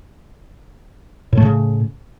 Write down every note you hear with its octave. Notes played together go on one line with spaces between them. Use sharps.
A2 C#3 A3